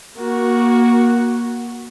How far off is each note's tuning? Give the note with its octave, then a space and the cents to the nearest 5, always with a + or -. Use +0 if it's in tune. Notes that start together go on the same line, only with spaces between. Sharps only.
A#3 +20 F#4 +0